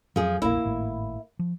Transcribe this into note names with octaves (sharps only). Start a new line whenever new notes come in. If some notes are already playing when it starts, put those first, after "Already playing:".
F2 F3 F#3 G#4
E1 A#1 A#3 E4
G#1 A2
F3